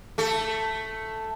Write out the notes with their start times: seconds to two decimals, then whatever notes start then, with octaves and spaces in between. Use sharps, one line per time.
0.18 A3 A4